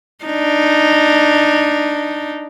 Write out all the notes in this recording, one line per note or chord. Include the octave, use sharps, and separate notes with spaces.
D4 D#4